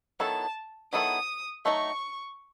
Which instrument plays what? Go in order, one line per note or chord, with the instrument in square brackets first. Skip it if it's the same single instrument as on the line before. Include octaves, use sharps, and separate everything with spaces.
[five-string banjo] D#3 F#3 B3 E4 A4 [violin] A5
[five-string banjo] D#3 F#3 B3 E4 A4 [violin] D#6
[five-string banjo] F#3 A3 D#4 G#4 D#5 [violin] C#6